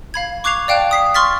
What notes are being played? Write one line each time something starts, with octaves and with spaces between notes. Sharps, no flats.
F5 B5 G#6
C#6 D6 F#6 G#6 C7 F7
D5 F5 G5 A5 F#6
D#6 B6 C7
C6 C#6 F6 A6 B6